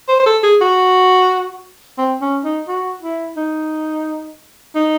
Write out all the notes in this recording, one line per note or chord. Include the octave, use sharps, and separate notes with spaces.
C5
C5
A4
G#4
F#4
C4
C#4
D#4
F#4
E4
D#4
D#4